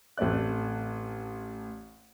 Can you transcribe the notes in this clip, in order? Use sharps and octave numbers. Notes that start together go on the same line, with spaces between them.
A1 A3 C4 D5 F#6